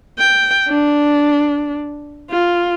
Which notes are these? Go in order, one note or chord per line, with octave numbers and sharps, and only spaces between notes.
G5
D4
F4